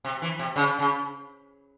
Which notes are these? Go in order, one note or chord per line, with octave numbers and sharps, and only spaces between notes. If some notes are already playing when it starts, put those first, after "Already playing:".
C3
E3
C3
C#3
C#3